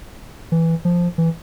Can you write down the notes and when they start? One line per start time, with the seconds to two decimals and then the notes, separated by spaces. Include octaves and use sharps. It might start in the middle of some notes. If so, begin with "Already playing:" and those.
0.52 E3
0.85 F3
1.18 E3